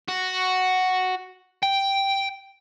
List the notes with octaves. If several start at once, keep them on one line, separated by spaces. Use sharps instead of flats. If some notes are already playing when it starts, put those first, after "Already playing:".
F#4
G5